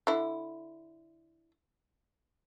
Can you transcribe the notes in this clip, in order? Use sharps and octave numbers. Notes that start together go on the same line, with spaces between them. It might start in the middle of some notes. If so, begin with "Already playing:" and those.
D3 E4